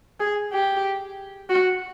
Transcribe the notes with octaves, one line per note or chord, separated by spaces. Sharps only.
G#4
G4
F#4